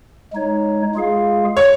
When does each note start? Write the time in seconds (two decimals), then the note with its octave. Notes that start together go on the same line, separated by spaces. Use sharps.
0.32 G#3 D#4 C#5
0.94 G#3 F4 G#4 F5
1.57 C#5